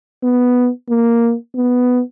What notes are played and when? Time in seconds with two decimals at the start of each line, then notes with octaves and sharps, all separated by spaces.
0.23 B3
0.89 A#3
1.55 B3